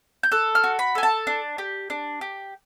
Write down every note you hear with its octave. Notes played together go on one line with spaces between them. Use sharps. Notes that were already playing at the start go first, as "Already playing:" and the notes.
G6
A4 F#6
F6
F#4
B5
A4 G#5
A5
D4
G4
D4
G4